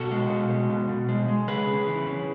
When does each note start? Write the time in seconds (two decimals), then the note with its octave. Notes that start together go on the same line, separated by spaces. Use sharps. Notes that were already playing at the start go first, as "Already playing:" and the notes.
Already playing: B2 F#4 A4
0.11 G#3
0.30 B2
0.50 G#3
0.70 B2
0.89 B2
1.09 G#3
1.28 G#3
1.47 C#3 G#4 B4
1.67 C#3
1.87 E3
2.06 C#3